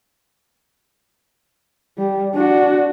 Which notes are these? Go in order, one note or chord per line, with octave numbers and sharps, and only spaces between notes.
G3
D4 F#4